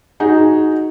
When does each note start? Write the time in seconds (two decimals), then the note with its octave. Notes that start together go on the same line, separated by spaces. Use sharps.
0.20 D#4 F#4 G#4